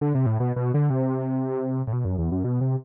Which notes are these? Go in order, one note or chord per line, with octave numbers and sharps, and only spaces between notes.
D3
C3
A2
B2
B2
D3
C3
A2
B2
F#2
E2
F#2
B2
C3